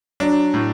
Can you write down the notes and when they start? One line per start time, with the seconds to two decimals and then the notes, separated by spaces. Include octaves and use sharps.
0.20 F#3 D4
0.54 A2